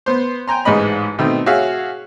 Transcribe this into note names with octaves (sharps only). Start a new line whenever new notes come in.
B3 C5
G5 G#5 A#5 C6
A1 G#2 G#3 B4 D#5 B5
B2 D#3 A3 C4
F#4 G#4 C#5 E5 F5